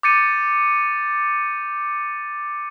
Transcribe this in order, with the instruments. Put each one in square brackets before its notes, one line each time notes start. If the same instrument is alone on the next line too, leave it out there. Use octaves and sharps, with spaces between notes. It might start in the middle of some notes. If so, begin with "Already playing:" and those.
[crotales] D6 G6 A6 C#7 D#7